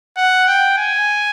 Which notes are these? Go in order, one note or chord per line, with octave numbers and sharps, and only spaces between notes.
F#5
G5
G#5